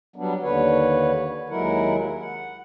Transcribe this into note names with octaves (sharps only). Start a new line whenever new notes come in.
F#3 G3 B3 D4
D#2 D3 B4 C#5
D#2 F#3 G#3 E4 A#4 F#5
F#5